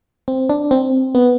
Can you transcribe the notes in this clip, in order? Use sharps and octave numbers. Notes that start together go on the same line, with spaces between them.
C4
D4
C4
B3